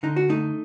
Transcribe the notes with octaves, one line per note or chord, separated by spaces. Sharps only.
D3 D#4
F#4
A3 D#4